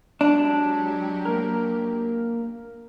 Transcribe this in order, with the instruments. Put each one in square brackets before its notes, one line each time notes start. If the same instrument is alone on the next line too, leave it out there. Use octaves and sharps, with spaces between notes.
[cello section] F#3 G#3 G4 [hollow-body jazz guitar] D4
[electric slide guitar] A#3 A#4